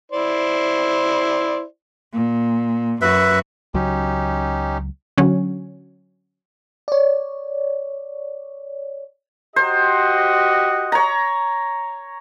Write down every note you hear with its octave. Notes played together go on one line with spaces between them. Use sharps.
E4 C5 D5
A#2
F#2 F#4 B4 E5
C#2 F#3 C#4 D#4 G4
D3 F#3 C#4
C#5 D5
F#4 G4 C5 D#5
C#5 A#5